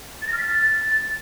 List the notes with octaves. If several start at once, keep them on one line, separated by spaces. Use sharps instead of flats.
A6
A#6
F6
B6
A6